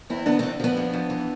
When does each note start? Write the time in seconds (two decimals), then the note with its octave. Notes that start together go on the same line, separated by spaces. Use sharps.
0.10 E2 C4 E4
0.26 D3 B3 D4
0.39 D3 A3 C4
0.60 F3 B3 D4
0.77 F2
0.93 F2
1.10 E3